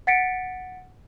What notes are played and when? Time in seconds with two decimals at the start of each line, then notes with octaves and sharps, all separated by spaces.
0.07 F#5 A6 B6 C#7 D7